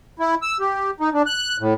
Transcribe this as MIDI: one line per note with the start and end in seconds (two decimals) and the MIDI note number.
0.19 0.35 64
0.42 0.58 88
0.60 0.91 67
1.00 1.10 63
1.14 1.22 62
1.26 1.57 90
1.60 1.74 45